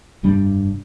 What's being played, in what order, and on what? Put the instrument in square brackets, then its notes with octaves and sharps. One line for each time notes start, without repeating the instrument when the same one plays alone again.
[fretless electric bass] F1 G2 G3 D4